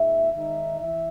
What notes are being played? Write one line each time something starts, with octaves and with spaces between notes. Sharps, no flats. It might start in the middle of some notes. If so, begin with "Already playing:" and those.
Already playing: A#2 G#3 D#4 E5
D#3 G#3 D#4 E5
E3 E5